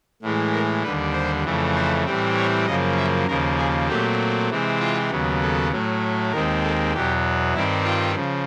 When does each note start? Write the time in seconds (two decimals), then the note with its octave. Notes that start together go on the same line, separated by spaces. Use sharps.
0.22 A2 E3 G#3
0.52 A#4
0.82 D#2 D3 G3 B4
1.13 C5
1.44 F2 C#3 E3 A3
1.74 C5
2.04 A2 E3 G3 C4
2.36 C#5
2.66 F#2 C#3 F3 A#3 D#5
2.97 E5
3.27 D#2 C#3 F3 A#3 A#4
3.58 G#4
3.88 A#2 F#3 A3 C4 G4
4.49 C3 E3 G#3 C4
4.79 F4
5.10 D#2 C#3 F#3 B3
5.41 A4
5.71 A2 F#3 A3
6.31 D#2 D#3 G#3 C4 A#4
6.63 A4
6.93 E2 B2 F#3 B3 G4
7.54 G2 D#3 G3 C4 E4
7.84 F4
8.15 C#3 F3